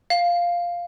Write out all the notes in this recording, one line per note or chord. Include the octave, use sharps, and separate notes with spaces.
F5